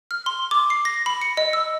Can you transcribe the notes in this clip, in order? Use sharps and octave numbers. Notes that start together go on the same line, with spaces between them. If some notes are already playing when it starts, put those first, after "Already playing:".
F6
C6
D6
C7
A#6
B5
C#7
D#5
E6